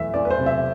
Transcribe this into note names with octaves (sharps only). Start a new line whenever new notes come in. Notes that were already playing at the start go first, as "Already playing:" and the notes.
Already playing: E2 E3 A3 E5
E2 D5
B4
C5
C3
E5